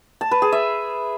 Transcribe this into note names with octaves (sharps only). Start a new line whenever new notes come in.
A5
B4
G#4
E5